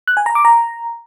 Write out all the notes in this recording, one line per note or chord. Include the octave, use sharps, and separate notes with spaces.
F#6
G#5
A#5
D6
A#5